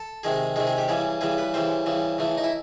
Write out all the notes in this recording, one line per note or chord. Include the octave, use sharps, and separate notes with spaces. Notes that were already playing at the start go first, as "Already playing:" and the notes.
Already playing: A4
C3 D#3 G#3 G#4
C3 D#3 G#3 G#4
G#4
G4
C#3 E3 G3 G#4
C#3 E3 G3 G#4
B4
C#3 E3 G3 C5
C#3 E3 G3
C#3 E3 A3
D#4
E4